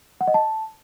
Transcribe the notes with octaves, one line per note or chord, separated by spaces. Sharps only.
F#5
D#5
A5